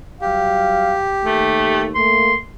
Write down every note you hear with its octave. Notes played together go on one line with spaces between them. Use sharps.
F#3 G3 G4 F5
D#2 A3
A3 A#3 C6